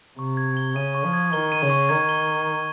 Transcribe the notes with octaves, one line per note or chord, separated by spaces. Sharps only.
C3 C#6
G#6
G7
C#3 D#7
C#6
F3
G#6
D#3 G7
D#7
C#3
C#6
D#3 G#6
G7